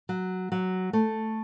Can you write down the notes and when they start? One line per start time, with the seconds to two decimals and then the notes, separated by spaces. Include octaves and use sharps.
0.09 F#3
0.52 F#3
0.93 A3